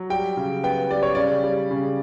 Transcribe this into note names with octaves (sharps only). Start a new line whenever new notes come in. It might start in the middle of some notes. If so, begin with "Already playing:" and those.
Already playing: F#3
G3 G5
C#3
B3 G5
G3 D5
C#5
C#3 D5
G3
C#3